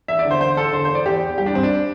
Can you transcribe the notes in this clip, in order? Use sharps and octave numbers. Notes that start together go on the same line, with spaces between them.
E2 E5
D5
D3
C5
D3 C5
E2 A4
D3 C5
C5
E2
D5
E2 G4
E2
G3 G4
D4
G2 C4
D4